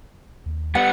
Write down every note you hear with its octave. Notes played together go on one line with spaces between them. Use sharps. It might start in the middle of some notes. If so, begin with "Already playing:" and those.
D#2
G3 B3 F#5